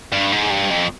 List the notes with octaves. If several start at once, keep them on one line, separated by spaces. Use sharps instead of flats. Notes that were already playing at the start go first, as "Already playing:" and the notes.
G2
G#2
G2
F2